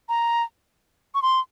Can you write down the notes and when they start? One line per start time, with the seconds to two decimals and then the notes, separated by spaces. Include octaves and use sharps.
0.09 A#5
1.15 C#6
1.22 C6